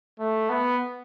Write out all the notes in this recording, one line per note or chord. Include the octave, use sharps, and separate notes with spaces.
A3
B3